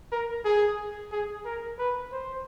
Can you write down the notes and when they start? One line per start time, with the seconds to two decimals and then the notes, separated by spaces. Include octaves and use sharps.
0.12 A#4
0.45 G#4
1.12 G#4
1.45 A#4
1.79 B4
2.12 C5